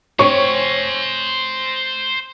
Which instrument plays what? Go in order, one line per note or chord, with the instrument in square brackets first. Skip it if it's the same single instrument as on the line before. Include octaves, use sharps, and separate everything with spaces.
[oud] C4 C#5 [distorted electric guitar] C5 G#5 [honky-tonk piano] C#6